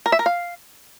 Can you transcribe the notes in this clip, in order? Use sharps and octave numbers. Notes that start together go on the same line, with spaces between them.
A#4
E5
A#4
F5